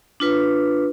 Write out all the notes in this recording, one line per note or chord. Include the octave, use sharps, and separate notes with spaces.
D4 F4 B4